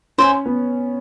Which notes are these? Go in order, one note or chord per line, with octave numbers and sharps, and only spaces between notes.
C#4 C5 E5 G#5
B3